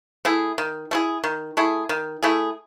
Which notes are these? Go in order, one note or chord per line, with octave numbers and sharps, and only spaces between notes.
A3 E4 G#4
D#3
A3 E4 G#4
D#3
A3 E4 G#4
D#3
A3 E4 G#4